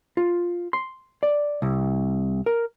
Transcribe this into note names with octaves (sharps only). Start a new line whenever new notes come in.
F4
C6
D5
C2
A#4